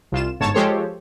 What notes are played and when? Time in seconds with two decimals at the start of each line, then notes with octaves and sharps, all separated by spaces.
0.12 C2 F4 E7
0.40 G1 G#2 C#5 A5 E7
0.54 F3 G#3 G4 A4 C5 C#5